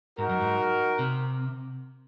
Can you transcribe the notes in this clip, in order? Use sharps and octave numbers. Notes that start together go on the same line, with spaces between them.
G#2 D#4 F#4 A#4
F#2
G#2
C3